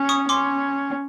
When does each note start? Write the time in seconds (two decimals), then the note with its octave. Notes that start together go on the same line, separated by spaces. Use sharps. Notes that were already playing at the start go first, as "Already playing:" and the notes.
Already playing: C#4
0.09 C#6 D#6
0.29 C#4 C6 D6